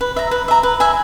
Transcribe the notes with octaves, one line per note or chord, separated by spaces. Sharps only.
B4
E5 A#5
B4
E5 A#5
B4
E5 G#5 B5